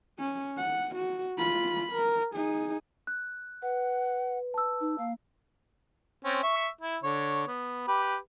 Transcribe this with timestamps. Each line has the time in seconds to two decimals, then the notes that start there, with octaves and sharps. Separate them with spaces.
0.19 C#4
0.57 F#5
0.95 F#4
1.38 F4 B5
1.92 A#4
2.35 D#4 G#4
3.07 F#6
3.62 B4 F#5
4.54 A5 E6
4.81 D#4
4.98 A#3 F5
6.25 C4 C#4
6.44 E5 C#6
6.82 E4
7.04 D3 C#5
7.48 B3
7.88 G4 B4